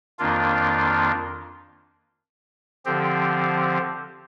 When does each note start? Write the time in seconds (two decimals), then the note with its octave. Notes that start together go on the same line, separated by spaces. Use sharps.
0.19 F2 D#3 A#3 D4 F4
2.86 D3 F3 C4 G4